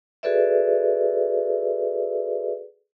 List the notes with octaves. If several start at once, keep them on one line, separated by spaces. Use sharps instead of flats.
F#4 G#4 A4 B4 D5 E5